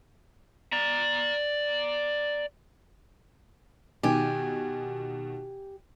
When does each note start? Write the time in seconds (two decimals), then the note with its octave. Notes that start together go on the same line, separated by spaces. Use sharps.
0.72 D5 A#5
4.03 B2 D#3 G4 G#5